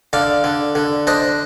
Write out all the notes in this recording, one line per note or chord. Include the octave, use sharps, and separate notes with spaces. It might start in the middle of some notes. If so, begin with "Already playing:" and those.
D3 D5 F5
D3
D3
D4 C5 D#5